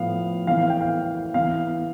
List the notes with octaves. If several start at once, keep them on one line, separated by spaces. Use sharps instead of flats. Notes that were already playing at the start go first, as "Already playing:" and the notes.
Already playing: A2 F3 B3 F5
E3 B3 F5
F5
G5
F5
E3 B3 F5